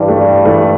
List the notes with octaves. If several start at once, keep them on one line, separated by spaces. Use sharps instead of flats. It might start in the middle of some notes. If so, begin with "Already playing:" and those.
Already playing: G2 E3 G3
A3
G3
E3 A3